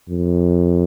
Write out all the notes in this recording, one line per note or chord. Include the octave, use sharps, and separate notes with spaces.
F2